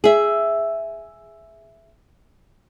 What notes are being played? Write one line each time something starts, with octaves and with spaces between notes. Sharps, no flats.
G#4 E5